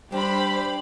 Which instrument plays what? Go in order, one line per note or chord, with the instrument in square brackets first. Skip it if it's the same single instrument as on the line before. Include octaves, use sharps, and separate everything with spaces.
[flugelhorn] G3 [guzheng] D4 [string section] G4 B5 [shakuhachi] C5